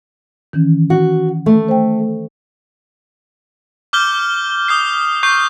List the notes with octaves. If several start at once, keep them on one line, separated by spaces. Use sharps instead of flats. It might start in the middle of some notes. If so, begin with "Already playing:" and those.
D#3 E3 C#4
F#4
A3
C5 G5
D6 F6 G6 G7
D#6 G6 C7
C#6 G6 C7